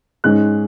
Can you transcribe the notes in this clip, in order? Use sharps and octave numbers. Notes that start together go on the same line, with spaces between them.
G#2 G#3 C#4 F#6